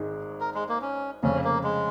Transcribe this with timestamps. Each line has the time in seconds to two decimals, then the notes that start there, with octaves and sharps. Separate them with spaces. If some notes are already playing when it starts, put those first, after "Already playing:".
Already playing: G#1 G#2 D#3 G#3
0.40 A#4
0.54 G#3
0.69 A#3
0.82 C#4
1.23 F1 F2 C#3 C#4
1.44 A#3
1.63 G#3